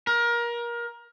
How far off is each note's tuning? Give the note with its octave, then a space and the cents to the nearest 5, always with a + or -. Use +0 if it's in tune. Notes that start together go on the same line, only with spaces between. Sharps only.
A#4 +25